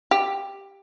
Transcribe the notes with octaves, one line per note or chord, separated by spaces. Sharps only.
G4